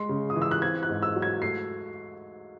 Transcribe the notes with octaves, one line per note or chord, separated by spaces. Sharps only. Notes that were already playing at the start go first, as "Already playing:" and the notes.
Already playing: G#3 C6
C#3
D#6
E3
E6
F#6
C4 G#6
F#6
G#2
E6
F#3
G#6
A3 C7